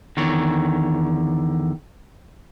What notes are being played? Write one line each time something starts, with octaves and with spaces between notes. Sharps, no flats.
E2 D3 D#3 C#5